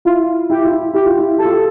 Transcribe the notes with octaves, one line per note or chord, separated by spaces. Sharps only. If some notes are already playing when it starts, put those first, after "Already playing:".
E4 F4
E4 G4
F4
E4
E4 G4
F4
E4
G4 A4
F4
G4